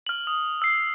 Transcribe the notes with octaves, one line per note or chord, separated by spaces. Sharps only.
F6 F#7
D#6
E6 C7